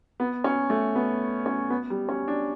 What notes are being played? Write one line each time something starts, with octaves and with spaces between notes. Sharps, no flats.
B3
C#4
A3
B3
C#4
B3
G3
C#4
D4